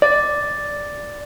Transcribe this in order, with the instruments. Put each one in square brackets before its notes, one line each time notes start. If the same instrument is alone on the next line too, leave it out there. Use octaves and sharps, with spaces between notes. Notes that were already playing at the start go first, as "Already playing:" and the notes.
[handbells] D5